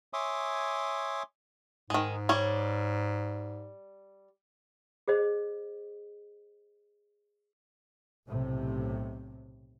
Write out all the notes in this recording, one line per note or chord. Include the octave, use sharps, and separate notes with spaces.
C#5 E5 G#5 C6 D6 D#6
G#2 D#3 G#3
G3 C#5
G#4 C5 D#5
B1 A2 C3